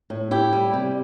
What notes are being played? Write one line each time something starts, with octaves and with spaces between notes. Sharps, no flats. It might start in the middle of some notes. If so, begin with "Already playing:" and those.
A2
A2 E4 G4
G3
C3